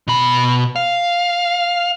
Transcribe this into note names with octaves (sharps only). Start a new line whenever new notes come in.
B2 B5
F5